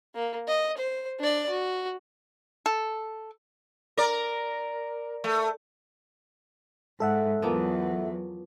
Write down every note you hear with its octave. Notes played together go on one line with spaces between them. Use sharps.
A#3
D#5
C5
D4 D5
F#4
A4
A#4 D5
A3
G#2 A4 E5 F#5
E2 F3 F#3 A#3 B3